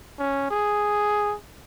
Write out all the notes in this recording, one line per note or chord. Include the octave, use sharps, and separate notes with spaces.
C#4
G#4